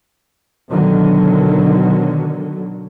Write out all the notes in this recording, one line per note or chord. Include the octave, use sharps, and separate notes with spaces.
B2 D3 D#3 F#3